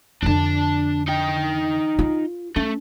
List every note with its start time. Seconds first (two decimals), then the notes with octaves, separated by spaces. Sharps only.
0.22 F2 D3 D4 A5
1.08 D#4 G5
1.99 F4
2.56 A3 C#4